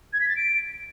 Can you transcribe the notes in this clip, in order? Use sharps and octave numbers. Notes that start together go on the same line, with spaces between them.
G#6
B6
A6
D7